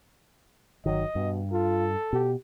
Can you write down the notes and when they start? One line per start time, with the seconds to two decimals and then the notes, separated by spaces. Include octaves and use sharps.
0.86 G1 D#3 F#3 D#5
1.15 G2 B2
1.52 F4 A4
2.13 B2 G4